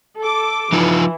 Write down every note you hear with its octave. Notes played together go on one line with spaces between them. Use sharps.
A4 D6
E3 F3 D#4 F4